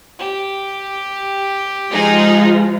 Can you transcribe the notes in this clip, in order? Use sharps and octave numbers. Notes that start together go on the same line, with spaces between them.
G4
F3 G#3 D#4 F4 G#4